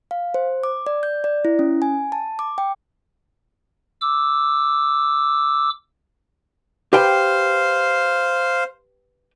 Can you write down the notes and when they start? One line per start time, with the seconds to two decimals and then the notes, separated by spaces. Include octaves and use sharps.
0.11 F5
0.34 C5
0.64 D6
0.87 D5
1.03 G6
1.24 D5
1.45 E4
1.59 C#4
1.82 G#5
2.12 A5
2.39 D6
2.58 G5
4.01 D6 E6
6.93 G4 B4 C5 F5 G5